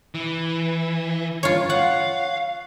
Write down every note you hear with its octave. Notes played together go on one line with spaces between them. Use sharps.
E3
F4 C#5
F5 F#5